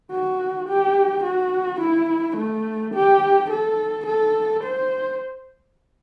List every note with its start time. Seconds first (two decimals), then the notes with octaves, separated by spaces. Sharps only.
0.11 F#4
0.68 G4
1.24 F#4
1.80 E4
2.37 A3
2.94 G4
3.50 A4
4.06 A4
4.63 C5